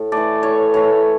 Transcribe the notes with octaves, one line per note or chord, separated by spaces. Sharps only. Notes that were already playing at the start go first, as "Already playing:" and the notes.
Already playing: A2
E3 A3 D5
A2 C#5
E3 A3 C#5